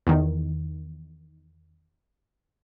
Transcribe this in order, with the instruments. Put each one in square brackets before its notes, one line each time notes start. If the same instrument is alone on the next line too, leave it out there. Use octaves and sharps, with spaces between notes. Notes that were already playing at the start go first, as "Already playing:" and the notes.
[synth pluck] E2 D#3